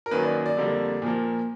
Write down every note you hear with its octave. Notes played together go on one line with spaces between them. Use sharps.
A#4
F#2 D#3 F#3 A#3 B4
D5
D5
F2 D3 G3 A#3
A#2 F3 A#3